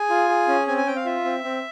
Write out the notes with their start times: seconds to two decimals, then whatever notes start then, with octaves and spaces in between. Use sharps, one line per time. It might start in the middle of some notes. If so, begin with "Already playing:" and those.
Already playing: G#4 G#5
0.10 F4
0.29 G#4
0.48 C#4
0.67 C4 G#5
0.77 G#5
0.87 C4 G5
0.96 F5
1.05 F4 E5
1.25 C4
1.44 C4